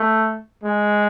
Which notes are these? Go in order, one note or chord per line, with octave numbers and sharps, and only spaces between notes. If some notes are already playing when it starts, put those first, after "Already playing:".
Already playing: A3
G#3